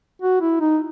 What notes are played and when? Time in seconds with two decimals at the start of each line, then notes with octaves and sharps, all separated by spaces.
0.22 F#4
0.41 E4
0.60 D#4